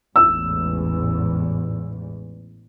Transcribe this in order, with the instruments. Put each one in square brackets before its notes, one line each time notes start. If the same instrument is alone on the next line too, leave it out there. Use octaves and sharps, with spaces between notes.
[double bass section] A1 E2 G#2 [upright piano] E6